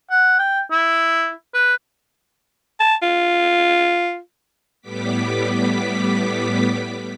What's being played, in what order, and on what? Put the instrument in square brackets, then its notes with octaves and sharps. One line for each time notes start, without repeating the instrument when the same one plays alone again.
[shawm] F#5
G5
E4
B4
[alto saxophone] A5
F4
[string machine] A2 G3 B3 D6 B6